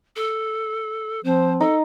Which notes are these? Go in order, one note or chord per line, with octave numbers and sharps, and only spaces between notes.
A4
F3 C4 C5
D#4 A4